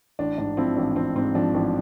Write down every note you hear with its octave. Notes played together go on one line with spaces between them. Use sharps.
A1 D4
G#2 D4
F3 C4 E4
A1 D4
A1 C4
G#2 C4
F3 D4
A1